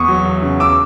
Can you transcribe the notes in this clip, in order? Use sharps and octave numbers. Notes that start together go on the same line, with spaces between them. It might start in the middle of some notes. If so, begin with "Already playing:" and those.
Already playing: E2 C#6 D#6
F#3
E2
C#3
D6 E6